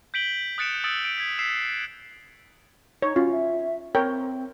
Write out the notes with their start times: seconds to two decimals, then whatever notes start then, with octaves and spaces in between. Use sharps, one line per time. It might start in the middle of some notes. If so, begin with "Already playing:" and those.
0.14 G6 B6 D7 F#7 G7
0.58 D#6 F#6 A6 C#7 D7 E7
0.84 D#6 E6 A6 D7 F#7 G7
1.05 D7
1.18 G#6 B6
1.39 E6 B6 C7 E7
3.02 D#4 C#5
3.16 C#4 F4 F#4
3.32 E5
3.95 C4 A#4 C#5 G5